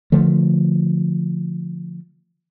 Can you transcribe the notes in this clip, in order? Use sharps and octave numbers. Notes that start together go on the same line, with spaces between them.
D3 F3 A3